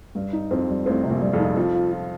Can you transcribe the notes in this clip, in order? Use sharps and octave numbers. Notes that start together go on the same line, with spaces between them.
G2 G3
D#4
F2 C4
G3
A1 A2 C4
C3
A#1 A#2
G3
F2 F3
D#4
F2 F3 F4
F4
F4